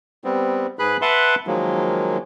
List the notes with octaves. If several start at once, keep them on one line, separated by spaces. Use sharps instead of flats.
G3 B3 C4
G#2 G#4 B4 B5 F#6
B4 E5 F#5 A5 C6
D#3 F3 F#3 G#3 A#3